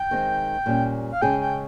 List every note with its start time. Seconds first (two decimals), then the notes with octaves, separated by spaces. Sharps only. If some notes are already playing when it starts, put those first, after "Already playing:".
Already playing: G5
0.11 D#3 G#3 C4
0.66 A#2 G3 C#4
1.12 F5
1.22 C#3 G#3 C#4 G#4 G5
1.41 G5